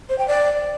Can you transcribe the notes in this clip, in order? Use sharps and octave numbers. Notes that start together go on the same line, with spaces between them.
C5
G5
D5